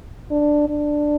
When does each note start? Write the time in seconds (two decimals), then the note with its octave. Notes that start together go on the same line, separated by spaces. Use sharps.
0.30 D4
0.68 D4